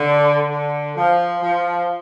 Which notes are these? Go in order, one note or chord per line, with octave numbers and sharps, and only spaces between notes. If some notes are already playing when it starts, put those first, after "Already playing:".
Already playing: D3
D3
F3
F3